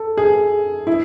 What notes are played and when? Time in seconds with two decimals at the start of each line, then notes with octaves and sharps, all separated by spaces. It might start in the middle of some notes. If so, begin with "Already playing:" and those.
Already playing: A4
0.17 G#4
0.87 E4